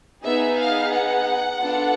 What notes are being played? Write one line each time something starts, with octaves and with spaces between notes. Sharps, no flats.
B3 D#4 G#4 E5
F5
F#5
B3 D4 F4 A4